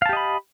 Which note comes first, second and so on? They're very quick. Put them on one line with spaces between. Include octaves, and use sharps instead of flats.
F5 A5 G4 D#5 B5